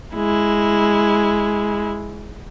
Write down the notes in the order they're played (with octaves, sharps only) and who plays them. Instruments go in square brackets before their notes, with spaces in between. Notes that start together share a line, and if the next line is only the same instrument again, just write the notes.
[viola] G#3 E4